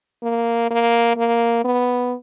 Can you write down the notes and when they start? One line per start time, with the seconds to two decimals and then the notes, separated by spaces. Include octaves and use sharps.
0.23 A#3
0.71 A#3
1.17 A#3
1.65 B3